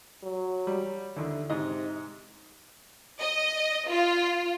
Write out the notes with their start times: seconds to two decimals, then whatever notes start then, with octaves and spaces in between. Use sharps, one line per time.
0.23 F#3
0.67 G3
1.16 D#2 D3 E4
1.50 G#2 C3 D#5
3.20 D#5
3.89 F4